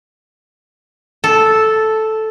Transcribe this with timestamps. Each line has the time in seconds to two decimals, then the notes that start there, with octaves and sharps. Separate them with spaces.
1.24 A4